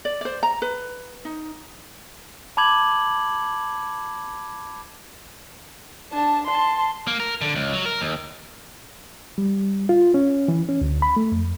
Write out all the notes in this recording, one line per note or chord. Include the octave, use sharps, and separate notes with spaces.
D5
C5 D5
A#5
B4
D#4
A5 B5 D6 G#6 F#7
D4 A5
A5 C6
A#3
A#4
D3
C#2
F#3
A#4
D#2
G3
F4
C#4
E3
C#4
D2
B5
A3
F2